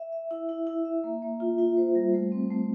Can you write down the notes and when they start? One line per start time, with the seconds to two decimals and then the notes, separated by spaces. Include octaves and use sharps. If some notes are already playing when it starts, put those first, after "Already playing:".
Already playing: E5
0.12 E5
0.31 E4
0.49 E4
0.67 E4
0.85 E5
1.04 A#3
1.22 A#3
1.40 F4
1.58 F4
1.77 C5
1.95 G3
2.13 A3
2.32 C4
2.50 A3